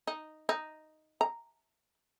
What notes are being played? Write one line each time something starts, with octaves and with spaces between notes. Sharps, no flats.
D#4
D#4
A#5